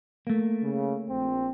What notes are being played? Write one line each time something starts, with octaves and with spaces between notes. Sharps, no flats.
A3 A#3
C#3
A#1 C4